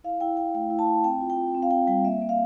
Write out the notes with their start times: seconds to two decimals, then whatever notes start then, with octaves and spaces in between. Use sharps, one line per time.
0.04 E4 F5
0.20 E4 G5
0.37 E4 G5
0.54 A3 G5
0.70 E4
0.79 A5
0.87 E4
1.04 C4 G5
1.21 F4
1.30 G5
1.37 F4
1.55 C4
1.62 F5
1.71 C4 G5
1.87 G3 G5
2.05 A#3 E5
2.22 A#3
2.29 F5